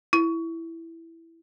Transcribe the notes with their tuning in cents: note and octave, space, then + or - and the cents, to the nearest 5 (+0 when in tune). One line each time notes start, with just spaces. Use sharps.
E4 +5